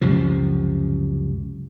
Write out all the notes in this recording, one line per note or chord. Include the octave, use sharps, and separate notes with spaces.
C#2 F#2 C3 F3